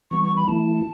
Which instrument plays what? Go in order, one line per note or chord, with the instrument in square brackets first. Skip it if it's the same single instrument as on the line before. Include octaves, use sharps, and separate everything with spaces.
[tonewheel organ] E3 G3 B3 [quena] C#6
[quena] C#6
B5
[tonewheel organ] E3 A3 E4 [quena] A5